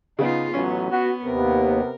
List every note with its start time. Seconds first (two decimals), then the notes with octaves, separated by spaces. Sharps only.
0.19 C#3 B3 D#4 F4
0.54 A1 F#3 B3 C#4
0.91 B3 F#4
1.25 D#2 C3 B3 A#4